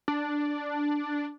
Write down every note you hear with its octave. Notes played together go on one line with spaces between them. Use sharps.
D4